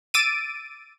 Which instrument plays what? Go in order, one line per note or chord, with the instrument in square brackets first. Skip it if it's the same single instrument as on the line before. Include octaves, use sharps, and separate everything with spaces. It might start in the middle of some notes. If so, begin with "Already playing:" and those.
[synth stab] D6 E6 A6 D7 D#7